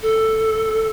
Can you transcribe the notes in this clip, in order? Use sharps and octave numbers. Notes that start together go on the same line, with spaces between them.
A4